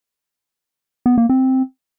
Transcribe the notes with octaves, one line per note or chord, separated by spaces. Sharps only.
B3
A#3
C4